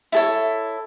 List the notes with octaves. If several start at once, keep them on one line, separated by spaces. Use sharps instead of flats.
E4 A4 C#5